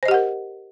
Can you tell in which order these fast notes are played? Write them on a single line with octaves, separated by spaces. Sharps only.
C5 D#5 G4 F#5 A#4